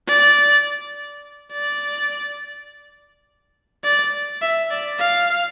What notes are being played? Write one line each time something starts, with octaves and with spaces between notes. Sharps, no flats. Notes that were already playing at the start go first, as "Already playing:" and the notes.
D5
D5
D5
E5
D5
F5